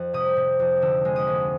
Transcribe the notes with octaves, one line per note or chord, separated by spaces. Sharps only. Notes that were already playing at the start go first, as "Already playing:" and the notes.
Already playing: F2
C3 D#6
C3
F2
D3 E6
G#3
D#6
D2